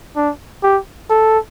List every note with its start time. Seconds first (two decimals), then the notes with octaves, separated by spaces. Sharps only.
0.16 D4
0.63 G4
1.10 A4